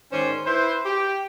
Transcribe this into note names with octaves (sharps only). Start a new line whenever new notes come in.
G#2 D#3 C#4 C5 D5 C6
E4 B4 C5
G4